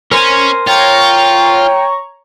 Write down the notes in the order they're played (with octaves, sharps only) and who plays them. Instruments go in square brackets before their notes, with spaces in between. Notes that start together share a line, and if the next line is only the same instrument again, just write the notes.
[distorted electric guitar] C#4 [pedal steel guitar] A#4 C5 G#5
[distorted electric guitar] F4 [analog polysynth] C#5 A#5 C#6 [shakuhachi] G5